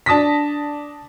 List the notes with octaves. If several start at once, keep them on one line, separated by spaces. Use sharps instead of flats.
D4 A5 D#6 A#6 B6